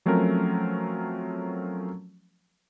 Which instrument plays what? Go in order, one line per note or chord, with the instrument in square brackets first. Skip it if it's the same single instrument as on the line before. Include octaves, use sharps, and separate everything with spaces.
[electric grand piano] F3 F#3 A3 C4 C#4 A#4